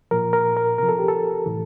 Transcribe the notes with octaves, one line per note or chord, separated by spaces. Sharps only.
A#2 F3 A#4
A#4
A#4
C3 F3 A#4
A4
G4
A4
A2 E3